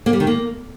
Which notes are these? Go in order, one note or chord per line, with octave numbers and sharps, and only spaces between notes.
A#3
G3
D#3
A#3